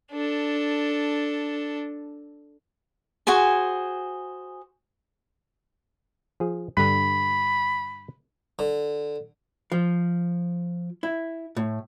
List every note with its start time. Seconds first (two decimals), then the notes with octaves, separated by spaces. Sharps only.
0.11 D4 A4
3.27 F#4 G#4 C5 G#5
6.40 F3 G#4
6.77 G2 D3 B5
8.59 D3
9.72 F3
11.03 E4
11.57 A2